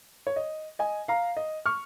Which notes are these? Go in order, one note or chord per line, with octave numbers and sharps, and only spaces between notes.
C#5
D#5
D#5 G#5
F5 A#5
D#5
C#6 F6